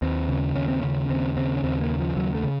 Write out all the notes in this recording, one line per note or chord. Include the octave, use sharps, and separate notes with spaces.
D#2 C4
C#3
D#2 C#4
C4
C#3 C#4
D#2 C4
C#3 C4
C#4
D#2 C4
A#3
C#3
F3
D#2 F#3
A3
C#3